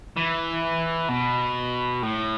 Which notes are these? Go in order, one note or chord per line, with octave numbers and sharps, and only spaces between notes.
E3
B2
A2